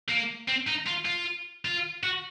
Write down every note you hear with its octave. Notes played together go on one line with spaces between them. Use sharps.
A#3
C4
D#4
F4
F4
F4
F#4